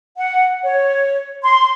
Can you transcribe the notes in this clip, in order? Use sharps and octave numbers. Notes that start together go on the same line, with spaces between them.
F#5
C#5
C6